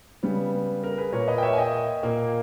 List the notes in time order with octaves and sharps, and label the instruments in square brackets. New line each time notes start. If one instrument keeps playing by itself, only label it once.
[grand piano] C#3 G3 B3
A#4
G#4 B4
A#2 A#3 A#4 C#5
B4 D#5
G5
C#5 E5
G#5
D#5 G5
A#2 A#3